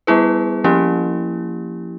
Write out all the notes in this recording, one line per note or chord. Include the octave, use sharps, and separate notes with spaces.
G3 B3 E4 G#4 B4
F3 A#3 C#4 E4 G4